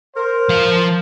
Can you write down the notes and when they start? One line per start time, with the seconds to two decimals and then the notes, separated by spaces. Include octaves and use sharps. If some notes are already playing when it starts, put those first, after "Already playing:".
0.16 A#4 C5
0.49 F3 F5